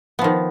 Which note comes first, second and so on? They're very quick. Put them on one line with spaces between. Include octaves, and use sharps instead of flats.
B3 F3 D#3